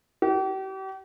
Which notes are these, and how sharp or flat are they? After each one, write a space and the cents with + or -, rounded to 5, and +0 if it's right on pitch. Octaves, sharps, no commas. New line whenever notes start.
G4 -40